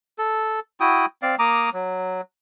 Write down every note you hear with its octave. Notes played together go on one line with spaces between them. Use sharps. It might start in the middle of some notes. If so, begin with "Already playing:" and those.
A4
E4 F#4 G5 D#6
C4 D5 F5
A#3 A#5 D6 D#6
F#3